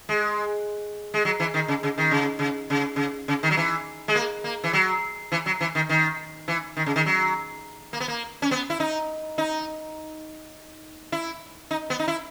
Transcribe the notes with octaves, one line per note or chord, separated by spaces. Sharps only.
G#3
G#3
F#3
E3
D#3
C#3
C#3
D#3
C#3
C#3
C#3
C#3
C#3
D#3
F#3
E3
G#3
A#3
A#3
E3
F#3
E3
F#3
E3
D#3
D#3
E3
D#3
C#3
D#3
F#3
A#3
B3
A#3
C#4
B3
E4
D#4
D#4
E4
D#4
B3
D#4
E4